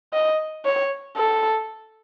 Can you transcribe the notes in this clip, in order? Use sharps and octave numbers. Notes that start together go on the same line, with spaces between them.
D#5
C#5
A4